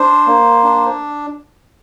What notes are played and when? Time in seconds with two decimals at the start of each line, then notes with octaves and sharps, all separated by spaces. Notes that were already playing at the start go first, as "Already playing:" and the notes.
Already playing: D4 C5
0.27 A#3
0.64 D4